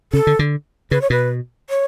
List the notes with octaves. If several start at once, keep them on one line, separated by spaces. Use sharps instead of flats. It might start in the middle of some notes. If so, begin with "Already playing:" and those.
C#3 A4
D3
D3
C#3 B4
C#5
B2 B4
C#5